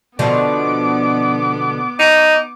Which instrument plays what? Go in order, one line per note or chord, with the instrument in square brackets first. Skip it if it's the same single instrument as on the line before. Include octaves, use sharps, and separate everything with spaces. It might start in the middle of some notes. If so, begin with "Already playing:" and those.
[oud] B2 D3 F3 [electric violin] B3 D6
[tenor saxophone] D#4